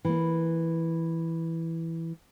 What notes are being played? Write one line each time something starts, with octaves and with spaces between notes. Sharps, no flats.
E3 A#3